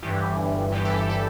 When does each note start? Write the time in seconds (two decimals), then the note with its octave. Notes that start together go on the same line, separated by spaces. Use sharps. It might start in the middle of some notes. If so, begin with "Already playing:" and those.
0.03 G1 G2 E3 G4
0.72 G1 G2 E3 G4
0.85 A4
0.97 G4
1.09 A4